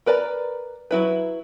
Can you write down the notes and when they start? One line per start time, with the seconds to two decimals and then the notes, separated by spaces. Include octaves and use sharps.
0.06 A#4 B4 D5 A#5
0.91 F#3 E4 B4